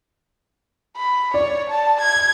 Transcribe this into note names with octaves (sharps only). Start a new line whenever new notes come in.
B5
C#5 D5
A5
G#6